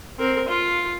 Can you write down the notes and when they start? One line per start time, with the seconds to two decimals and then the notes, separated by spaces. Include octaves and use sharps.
0.19 C4 A#4
0.49 F4